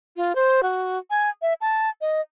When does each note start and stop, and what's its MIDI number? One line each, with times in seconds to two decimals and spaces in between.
0.17 0.35 65
0.35 0.61 72
0.63 0.98 66
1.10 1.30 80
1.42 1.54 76
1.61 1.89 81
2.01 2.21 75